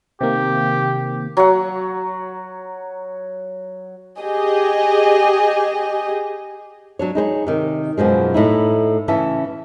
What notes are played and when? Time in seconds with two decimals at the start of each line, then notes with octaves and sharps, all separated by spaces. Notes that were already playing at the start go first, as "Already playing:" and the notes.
0.21 C3 D#3 A#3 G4
1.37 F#3 F#5
4.20 G4 G#4 D#5
6.99 F#3 D4 C#5
7.15 D#4 G#4 C5 C#5
7.47 C3 D#3
7.98 F#2 B2 F3 G#3
8.34 A2 D#4 E4
9.08 C#3 E3 C#4 C#5 E5 A5